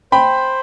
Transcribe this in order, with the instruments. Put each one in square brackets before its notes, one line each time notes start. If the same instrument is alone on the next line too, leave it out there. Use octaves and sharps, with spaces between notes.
[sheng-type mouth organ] C5 [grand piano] G5 B5